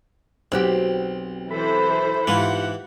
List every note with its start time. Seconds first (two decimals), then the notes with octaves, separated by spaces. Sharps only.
0.52 B1 C4 F#4 G4
1.51 E3 A4 C5 B5
2.27 G#2 E3 E4 F4 G4 F#5